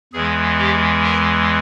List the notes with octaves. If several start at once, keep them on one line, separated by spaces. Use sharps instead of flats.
E2 E3 G#3 G#4
G4
A#4